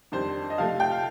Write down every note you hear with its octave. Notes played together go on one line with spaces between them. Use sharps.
F2 D#3 G3 D4 C5
D#5
C3 F3 A3 F5
F5
G5
F5